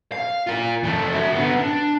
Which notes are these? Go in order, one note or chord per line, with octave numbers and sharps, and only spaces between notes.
F5
F4 A#4
F2 A3
F#4 E5
D3 B3
D4